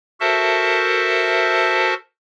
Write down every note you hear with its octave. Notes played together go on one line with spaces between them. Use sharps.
F#4 A4 A#4 C5 E5 A5